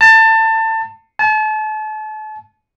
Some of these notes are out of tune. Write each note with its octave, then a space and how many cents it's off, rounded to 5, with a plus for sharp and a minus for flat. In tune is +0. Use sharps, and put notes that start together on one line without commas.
A5 +25
A5 -35